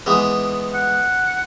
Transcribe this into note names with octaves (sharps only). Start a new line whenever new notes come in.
E3 G#3 B3
F#5